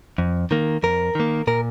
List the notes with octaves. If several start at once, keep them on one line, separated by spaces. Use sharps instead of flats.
F2
D#3 A#3
F2 A#4
D#3 A#3
A#2 A#4